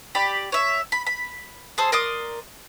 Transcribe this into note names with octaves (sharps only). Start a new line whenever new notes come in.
G4 D5 B5
C#5 E5
B5
B5
G#4 A4 C5 C6
A#4 D5 C6 D#6